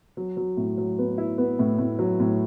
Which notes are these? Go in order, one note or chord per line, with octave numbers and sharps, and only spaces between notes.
F#3
F#3
A2
F#3
B3
E4
B3
A2
A2
F#3
A2